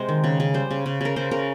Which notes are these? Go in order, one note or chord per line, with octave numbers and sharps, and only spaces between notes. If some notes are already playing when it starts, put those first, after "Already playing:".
Already playing: C3 G#3 C5
D#3
C#3
C#3
G3 C5
C#3
C#3
C#3 A#4
C#3 C5
C#3 A#4